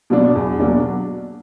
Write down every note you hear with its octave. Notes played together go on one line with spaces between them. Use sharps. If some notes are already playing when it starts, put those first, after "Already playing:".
B2 F#3 A#3 D4
E2
B2 F#3 A#3 D4